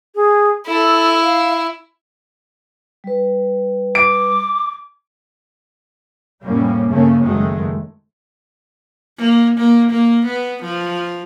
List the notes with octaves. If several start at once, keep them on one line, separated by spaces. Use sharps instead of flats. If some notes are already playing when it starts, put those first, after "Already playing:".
G#4
E4 A4
F5
G3 B4
D6 D7
F1 A2 G3 A#3 C#4
G2 C#3 A3 A#3 C#4
F#1 D#3 F#3 G#3 A3
A#3
A#3
A#3
B3
F3